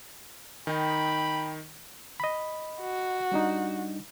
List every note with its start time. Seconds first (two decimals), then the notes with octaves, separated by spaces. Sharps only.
0.67 D#3 D#4 G5 B5
2.20 D#5 B5
2.81 F#4
3.32 G3 D4 D#4